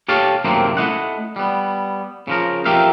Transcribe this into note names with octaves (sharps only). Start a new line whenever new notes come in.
G4 A4 C#5 F5 A5
F#2 A2 C3 D#3 A#3 C4
A3 E4 D#5 F#5
G3 B3
C#3 F3 A#4
F2 G4 A#4 E5 F5